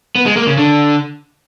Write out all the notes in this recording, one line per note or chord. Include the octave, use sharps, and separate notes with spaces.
B3
G#3
A#3
C#3
D3